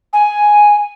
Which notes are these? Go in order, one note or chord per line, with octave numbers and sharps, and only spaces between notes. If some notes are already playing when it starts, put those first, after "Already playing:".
G#5